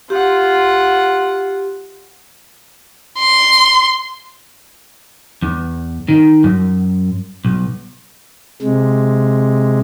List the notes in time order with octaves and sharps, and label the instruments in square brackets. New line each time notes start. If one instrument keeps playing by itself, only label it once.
[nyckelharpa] F4 F#5 [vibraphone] G4
[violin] C6
[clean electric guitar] E2
D#3
F#2
B1
[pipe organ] C3 G#3